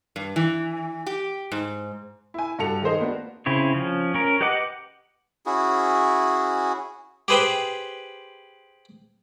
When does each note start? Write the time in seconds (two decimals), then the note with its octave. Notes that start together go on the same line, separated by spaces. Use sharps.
0.16 G2
0.36 E3
1.06 G4
1.52 G#2
2.34 E4 G#5
2.59 G2 F#4 A4 C#7 F7
2.82 D#3 G#3 G#4 C5 D#5
2.99 A#3 B3 D4 F#4
3.46 C#3 C4 E4 C#5
3.74 F3 C#4
4.14 C#4 A#4
4.41 G4 B4 D#5 F#5 D6
5.46 C#4 E4 F#4 G#4
7.28 G4 G#4 B4 C5 G5